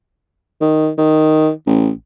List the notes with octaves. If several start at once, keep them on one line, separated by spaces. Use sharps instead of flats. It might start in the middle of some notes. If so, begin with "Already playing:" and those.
D#3
D#3
A1